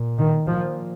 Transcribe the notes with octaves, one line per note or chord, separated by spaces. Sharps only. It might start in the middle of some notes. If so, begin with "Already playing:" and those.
Already playing: A#2
D#3
A#2 F3